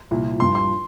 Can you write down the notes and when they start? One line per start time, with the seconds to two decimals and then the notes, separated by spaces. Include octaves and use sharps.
0.11 C2 A#2 F3
0.39 G2 F3 C6
0.55 C6